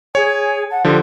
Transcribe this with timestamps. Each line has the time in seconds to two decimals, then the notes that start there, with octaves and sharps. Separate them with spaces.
0.15 G#4 C#5 G#5
0.69 F#5 A5
0.85 D3 F3 G4 A4